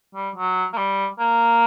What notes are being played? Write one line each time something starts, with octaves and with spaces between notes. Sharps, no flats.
G3
F#3
A#3
G3
A#3